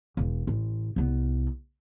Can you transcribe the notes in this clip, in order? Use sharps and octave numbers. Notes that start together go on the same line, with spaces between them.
E1
A1
C2 B3